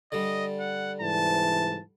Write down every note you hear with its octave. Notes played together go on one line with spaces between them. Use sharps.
D3 G3 D#5
F#5
G#2 C3 E3 A5